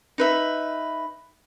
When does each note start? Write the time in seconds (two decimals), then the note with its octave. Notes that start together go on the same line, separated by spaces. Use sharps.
0.18 D#4 B4 E5